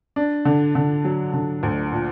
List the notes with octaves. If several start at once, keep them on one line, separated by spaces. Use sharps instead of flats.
D4
D3
D3
F#3
D3
D2
A#2